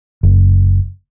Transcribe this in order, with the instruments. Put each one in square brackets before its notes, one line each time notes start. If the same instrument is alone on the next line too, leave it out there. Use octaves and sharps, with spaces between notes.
[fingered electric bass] F#1